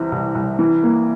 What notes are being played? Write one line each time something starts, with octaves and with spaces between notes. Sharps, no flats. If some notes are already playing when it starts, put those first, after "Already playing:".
Already playing: C2 C3 E3
C2
C2
E3
A#3